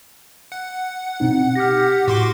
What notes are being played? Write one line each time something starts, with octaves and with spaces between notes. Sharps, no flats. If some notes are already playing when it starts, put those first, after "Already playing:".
F#5
B2 C4 D#4
G4 F6 A#6
A2 F#4 C6 D6